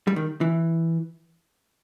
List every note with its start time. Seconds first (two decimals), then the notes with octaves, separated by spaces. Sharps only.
0.07 G3
0.16 D#3
0.41 E3